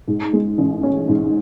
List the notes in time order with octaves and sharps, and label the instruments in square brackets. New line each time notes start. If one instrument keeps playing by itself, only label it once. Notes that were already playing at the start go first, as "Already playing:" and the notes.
[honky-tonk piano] G#2
G#3
A1
C#4
G#2